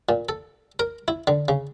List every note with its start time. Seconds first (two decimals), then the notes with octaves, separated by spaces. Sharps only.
0.09 A#2
0.29 A4
0.79 A#4
1.08 E4
1.27 D3
1.48 C#3